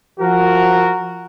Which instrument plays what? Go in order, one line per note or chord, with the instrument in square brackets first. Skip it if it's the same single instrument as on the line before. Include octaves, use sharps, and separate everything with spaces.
[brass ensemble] F3 F#4 A#4